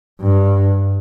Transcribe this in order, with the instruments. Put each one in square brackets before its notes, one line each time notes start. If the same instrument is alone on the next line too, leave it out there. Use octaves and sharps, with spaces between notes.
[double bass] G2